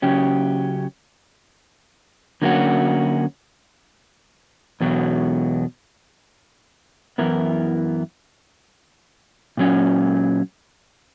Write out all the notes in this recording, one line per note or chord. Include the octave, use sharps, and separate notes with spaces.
C#3 F#3 C#4 G4
D3 F#3 A#3 C#4 F#4
E2 B2 F#3
F#2 E3 B3 E4 A#4
A#2 F#3 C#4